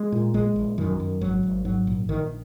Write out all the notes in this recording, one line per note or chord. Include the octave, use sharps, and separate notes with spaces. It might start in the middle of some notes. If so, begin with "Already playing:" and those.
Already playing: G#3
A#2
A#1 G#3
A#1
F#2 D#3
F#2
G#1 F#3
G#1
G#2 F#3
A#1
A#1 D#3